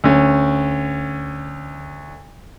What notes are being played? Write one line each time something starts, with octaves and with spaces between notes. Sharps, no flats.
D2 C#4